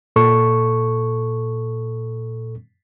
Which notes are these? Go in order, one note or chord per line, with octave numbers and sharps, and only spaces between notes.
A#2 A4 C#6